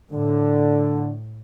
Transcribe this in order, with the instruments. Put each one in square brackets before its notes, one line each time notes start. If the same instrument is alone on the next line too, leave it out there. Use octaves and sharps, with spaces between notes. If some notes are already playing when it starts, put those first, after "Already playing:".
[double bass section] A2 [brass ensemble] D3